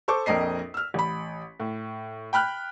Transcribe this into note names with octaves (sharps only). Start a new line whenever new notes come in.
A4 C5 C#6 D6
A#1 F2 A#4 D#5 C7
E6 F6
A1 B5
A2
G5 B5 F6 F#6